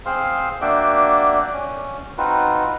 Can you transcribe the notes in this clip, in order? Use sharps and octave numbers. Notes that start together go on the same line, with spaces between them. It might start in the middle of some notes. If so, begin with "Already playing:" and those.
C4 G#4 C5 F5 C6
A#3 D4 F#4 D5 E5 G5
C#4
C4 D#4 F4 F#4 B4